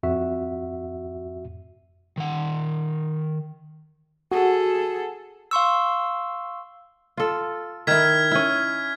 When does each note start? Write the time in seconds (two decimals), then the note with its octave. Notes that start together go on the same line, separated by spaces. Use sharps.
0.03 F2 F#4 E5
2.18 D#3 F#5
4.32 F#4 G#4 A4
5.51 F5 C6 C#6 E6
7.17 F4 A4
7.87 D#3 E4 F6 G#6 B6
8.31 C#4 E4